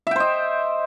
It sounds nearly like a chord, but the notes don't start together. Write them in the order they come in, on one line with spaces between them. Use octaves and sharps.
E5 G5 C5 D#5